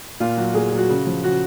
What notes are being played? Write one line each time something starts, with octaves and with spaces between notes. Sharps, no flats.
A#2 F4
F#3 F#4
A#2 G#4
F#3
F#4
C#3
F3
C#3 F#4